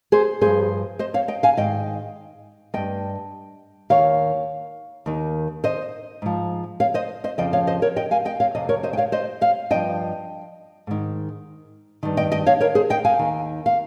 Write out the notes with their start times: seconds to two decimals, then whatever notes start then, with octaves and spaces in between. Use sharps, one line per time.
0.12 G#4 C5
0.41 G2 F3 G#4 C5
0.99 C5 D#5
1.14 C#5 F5
1.28 D#5 G5
1.43 F5 G#5
1.57 G#2 D#3 D#5 G5
2.74 G2 F3 D#5 G5
3.90 D#2 D#3 C#5 F5
5.06 D#2 D#3
5.64 C5 D#5
6.22 G#2 F3
6.80 C#5 F5
6.94 C5 D#5
7.24 C5 D#5
7.38 F2 C#3 F3 D#5 G5
7.53 C#5 F5
7.67 C5 D#5
7.82 A#4 C#5
7.96 D#5 G5
8.11 F5 G#5
8.25 D#5 G5
8.40 C#5 F5
8.55 F2 C3 D#5
8.69 A#4 C#5
8.83 C5 D#5
8.93 G5
8.97 C#5 F5
9.12 C5 D#5
9.41 C#5 F5
9.71 G2 F3 D#5 G5
10.87 G#2 D#3
12.03 G2 D#3
12.17 D#5 G5
12.32 D#5 G5
12.46 C#5 F5
12.61 A#4 C#5
12.75 G#4 C5
12.90 D#5 G5
13.05 F5 G#5
13.19 D#2 D#3
13.66 F5